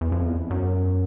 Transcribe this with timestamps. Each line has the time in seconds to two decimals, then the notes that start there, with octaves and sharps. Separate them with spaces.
0.01 E2
0.12 F2
0.25 E2
0.50 F#2